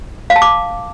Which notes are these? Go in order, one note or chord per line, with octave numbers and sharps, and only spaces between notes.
F5
A5
D6